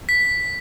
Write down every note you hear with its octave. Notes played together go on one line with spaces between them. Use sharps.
B6